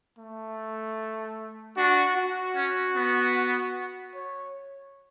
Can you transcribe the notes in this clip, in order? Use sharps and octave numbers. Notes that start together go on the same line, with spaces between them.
A3
D4 F#4
F#4
C#4
B3
C#5